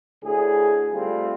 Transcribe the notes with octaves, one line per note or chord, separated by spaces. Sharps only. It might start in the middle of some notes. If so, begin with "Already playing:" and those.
D2 A2 G#4
G3 A3 C4 F4